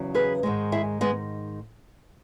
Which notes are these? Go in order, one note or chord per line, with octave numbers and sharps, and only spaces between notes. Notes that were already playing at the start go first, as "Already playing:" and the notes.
Already playing: E2 C#3 F#3
G#4 B4
G#2 D#3 G#3
E4 G#4
G#3 B3